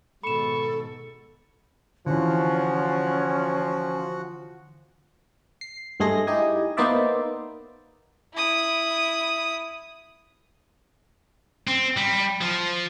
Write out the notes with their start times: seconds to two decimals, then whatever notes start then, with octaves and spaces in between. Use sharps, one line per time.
0.23 G#2 B2 D#3 A4 B5 C#6 E7
2.06 D3 E3 F3 C#4 F#4 F#5
5.61 C7
6.00 G2 G#3 A3 G#4 C6 A#6
6.27 D#4 E4 G4 D#5 G#5
6.77 A#3 B3 D#4 C5 D5 E5
8.34 E4 D#6
11.67 C4
11.97 G3
12.42 F3